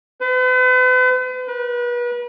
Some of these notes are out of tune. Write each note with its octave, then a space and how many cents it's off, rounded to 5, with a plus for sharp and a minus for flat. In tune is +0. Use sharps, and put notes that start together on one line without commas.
B4 +45
B4 -35